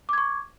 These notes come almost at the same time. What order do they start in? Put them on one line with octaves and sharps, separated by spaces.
D6 G#6 C#6